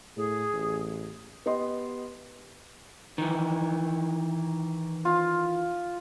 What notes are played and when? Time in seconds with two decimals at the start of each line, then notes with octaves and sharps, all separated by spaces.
0.17 A2 G#4
0.53 A1
1.46 B3 G4 D#5 C6
3.18 D#3 E3
5.05 F4